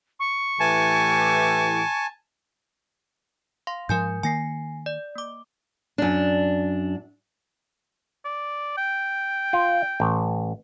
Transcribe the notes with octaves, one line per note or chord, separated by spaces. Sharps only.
C#6
A2 E3 G4 G#5 A5
F5 C6
G#2 F3 A#4 G#5 G6
D#3 A#3 G#5 A#6 C7
D5
A#3 D6
F#2 D4
D5
G5
F4
A1